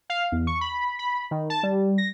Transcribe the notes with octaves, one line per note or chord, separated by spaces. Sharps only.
F5
E2
C#6
B5
B5
D#3
A5
G3
A#6